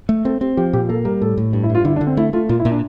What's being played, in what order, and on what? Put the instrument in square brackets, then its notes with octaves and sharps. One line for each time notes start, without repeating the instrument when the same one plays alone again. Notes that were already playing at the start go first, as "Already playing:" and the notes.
[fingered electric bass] A3
[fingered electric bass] C4 [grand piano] A4
[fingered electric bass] C4 [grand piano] G4
[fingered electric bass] F3 [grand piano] G4
[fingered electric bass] A#2 [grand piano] G4
[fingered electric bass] A#3 [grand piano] A4
[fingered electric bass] G3 [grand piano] A#4
[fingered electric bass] A2 [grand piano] A4
[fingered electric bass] A2
G2
[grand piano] E4
[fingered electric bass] G2 [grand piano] F4
[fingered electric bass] D3 [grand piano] E4
[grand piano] D4
[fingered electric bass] D3
[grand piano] C4
[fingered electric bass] A3 [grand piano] E4
[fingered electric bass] A3 [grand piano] F4
[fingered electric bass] A#2 [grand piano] F4
[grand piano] E4
[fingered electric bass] A#2
[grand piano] D4